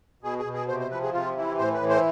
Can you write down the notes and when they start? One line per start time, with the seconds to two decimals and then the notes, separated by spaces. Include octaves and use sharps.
0.23 B2 G#4
0.39 G#4
0.45 B2
0.54 G#4
0.68 C3 C5
0.80 C5
0.90 F3 B4
1.02 G#4
1.13 C3 F4
1.37 E3 E4
1.58 A2 C5
1.74 B4
1.81 E3
1.89 C5